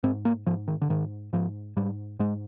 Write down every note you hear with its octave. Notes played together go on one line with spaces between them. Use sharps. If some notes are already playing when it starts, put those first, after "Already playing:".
G#2 C4
A#3
G#2 F3
D#3
D3
G#2 D#3
G#2 F3
G#2 G3
G#2 G#3